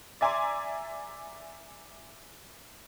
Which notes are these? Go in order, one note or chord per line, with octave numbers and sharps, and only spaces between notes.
D5 E5 G#5 A#5 C6 D6